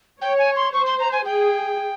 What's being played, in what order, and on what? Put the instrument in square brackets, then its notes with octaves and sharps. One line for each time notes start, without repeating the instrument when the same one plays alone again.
[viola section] C#5 [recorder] G5
[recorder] G#5
C6
[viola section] C5 [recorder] C#6
[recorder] C6
A#5
G#5
[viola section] G#4 [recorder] G5